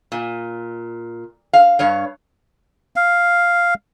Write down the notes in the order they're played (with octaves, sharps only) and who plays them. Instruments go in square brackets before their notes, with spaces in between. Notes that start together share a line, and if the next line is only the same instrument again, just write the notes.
[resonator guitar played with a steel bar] A#2
F5
G2 C#5 F5
[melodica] F5